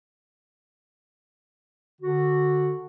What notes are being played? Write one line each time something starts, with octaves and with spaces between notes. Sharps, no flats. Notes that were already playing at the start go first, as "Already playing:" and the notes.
D3 F#4